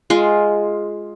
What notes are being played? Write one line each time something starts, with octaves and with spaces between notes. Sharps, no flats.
G#3 F4